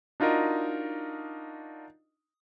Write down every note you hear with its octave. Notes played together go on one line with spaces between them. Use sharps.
D4 D#4 F4 F#4 A#4 D#5